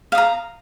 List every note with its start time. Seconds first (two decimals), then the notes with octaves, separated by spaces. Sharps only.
0.12 F5
0.15 D#6
0.18 A#5